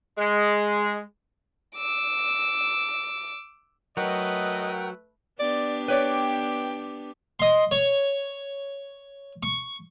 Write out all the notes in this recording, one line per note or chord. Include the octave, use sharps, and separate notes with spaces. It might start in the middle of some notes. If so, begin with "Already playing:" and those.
G#3
D6 E6
F#3 A3 A#4 B4 D#5 F#5 G5
B3 D4 G4 D5
B4 C#5 D5 G5
D#5 C6
C#5
C#6